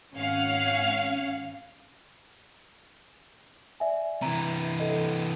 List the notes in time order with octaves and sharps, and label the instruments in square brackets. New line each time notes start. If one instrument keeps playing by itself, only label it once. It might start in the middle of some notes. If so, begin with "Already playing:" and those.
[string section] G#1 C#4 F5 F#5
[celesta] D5 E5 G#5
[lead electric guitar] C3 E3 [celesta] A#5
[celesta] A4 D#5